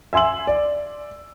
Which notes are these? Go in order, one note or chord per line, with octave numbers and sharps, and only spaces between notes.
E5 G#5 C6 E6 F#7
D5